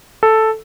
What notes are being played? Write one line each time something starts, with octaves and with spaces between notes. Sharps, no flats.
A4